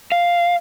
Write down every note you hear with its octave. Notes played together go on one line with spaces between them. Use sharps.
F5